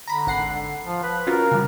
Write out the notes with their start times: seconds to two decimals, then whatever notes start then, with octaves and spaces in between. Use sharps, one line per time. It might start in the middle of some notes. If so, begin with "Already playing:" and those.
0.07 D3 A#5 B5
0.27 G#1 F#5 C7
0.85 F3
1.03 B4
1.27 C#4 F4 F#4 A#4
1.52 C#3 G3